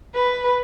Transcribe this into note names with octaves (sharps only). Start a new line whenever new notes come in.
B4